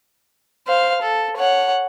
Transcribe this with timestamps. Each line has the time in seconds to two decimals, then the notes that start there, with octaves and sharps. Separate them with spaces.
0.68 C5 F5
1.02 A4
1.37 C#5 F#5